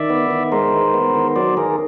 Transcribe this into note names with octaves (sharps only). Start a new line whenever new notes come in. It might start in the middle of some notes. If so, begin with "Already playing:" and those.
Already playing: D#3 D5 E5
B3
D#3
G#3 A#4 C5
D#3
B3
D#3
F#3 C5 D5
D#3 G#4 A#4